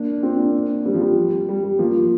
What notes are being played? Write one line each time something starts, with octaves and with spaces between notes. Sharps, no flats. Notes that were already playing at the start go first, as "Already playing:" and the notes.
Already playing: A#3 D4
C4 F4
A#3 D4
G3 C4
F3
G3
G3
G3
F3 A#3